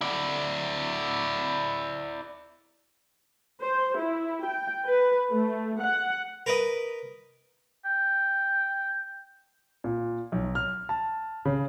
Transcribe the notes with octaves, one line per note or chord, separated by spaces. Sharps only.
E4 D5
C5
E4
G5
B4
A3
F#5
A#4 B4 D#5
G5
A#2
B1
F6
A5
C#3